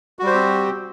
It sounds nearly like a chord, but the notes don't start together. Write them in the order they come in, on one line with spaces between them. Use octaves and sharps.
F#4 G3 C5 G4 C4